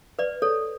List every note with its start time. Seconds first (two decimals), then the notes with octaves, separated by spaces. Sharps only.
0.19 B4 D5
0.42 A4 C#5